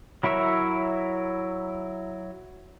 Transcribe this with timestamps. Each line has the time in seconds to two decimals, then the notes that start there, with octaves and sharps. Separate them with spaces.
0.23 F#3 E4 A#4 C#5 E5